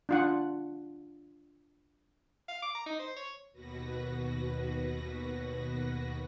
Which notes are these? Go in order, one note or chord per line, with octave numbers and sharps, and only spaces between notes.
D4 F4 F#5
F5
D6
A#5
D#4
C5
C#5
D#2 B2 F#4 B4 A#6